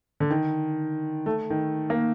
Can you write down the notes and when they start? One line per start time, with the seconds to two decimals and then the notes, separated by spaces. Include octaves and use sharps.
0.20 D3
0.30 D#3
1.26 A3
1.50 D#3
1.90 A#3